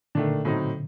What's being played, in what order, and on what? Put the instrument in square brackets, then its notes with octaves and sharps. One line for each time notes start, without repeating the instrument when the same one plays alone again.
[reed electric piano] A#2 D3 [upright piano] D#3 A3 D4
[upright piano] A2 F#3 C4 D#4